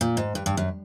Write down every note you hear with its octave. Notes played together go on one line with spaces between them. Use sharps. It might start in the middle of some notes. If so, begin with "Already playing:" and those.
A#2
G#2
G2
G2
F#2